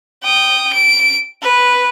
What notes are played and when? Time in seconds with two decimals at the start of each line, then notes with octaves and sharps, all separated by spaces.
0.23 G5 D#6
0.73 D7
1.42 B4